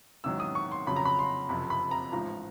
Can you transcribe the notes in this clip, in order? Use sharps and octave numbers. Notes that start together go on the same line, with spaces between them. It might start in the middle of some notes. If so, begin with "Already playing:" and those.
A1 G#2 D#3 F#3 E6
D#6
C#6
C6
F2 C#3 F#3 B5
A#5
B5
C6
F#1 F2 C3 B5
B5
A#5
A1 G#2 F3 A#5